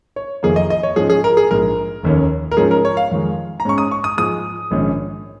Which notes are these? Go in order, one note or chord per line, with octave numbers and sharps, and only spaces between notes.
C#5
F1 F2 D#3 A#3 G#4
D#5
D#5
C#5
G#2 F3 G#3 C#4 G#4
G#4
A#4
G#4
A#1 G#2 G#3 A#4
F1 D#2 D#3 C#4
A#4
G#2 F3 G#3 C#4 G#4
A#4
C#5
F5
F2 D#3 G#3
A#5
G#2 G#3 C#4 C#6
D#6
C#6
D#6
G#2 F3 G#3 D#6
A#1 G#2 D#3 C#4